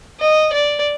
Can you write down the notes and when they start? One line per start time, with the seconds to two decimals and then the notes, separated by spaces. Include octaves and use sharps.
0.20 D#5
0.53 D5